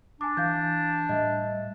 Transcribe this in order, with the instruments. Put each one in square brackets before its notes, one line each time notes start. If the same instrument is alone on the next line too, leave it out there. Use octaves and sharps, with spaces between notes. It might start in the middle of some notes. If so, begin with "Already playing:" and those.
[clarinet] D4 [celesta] G#5 D6
[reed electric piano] E3 [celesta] F5 G6
[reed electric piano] A2 G3 E5 [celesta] D#5